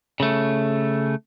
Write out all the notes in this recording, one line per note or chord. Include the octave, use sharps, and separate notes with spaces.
C#3 A3